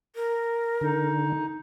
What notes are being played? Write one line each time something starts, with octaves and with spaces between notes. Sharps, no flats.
A#4
D3 D#4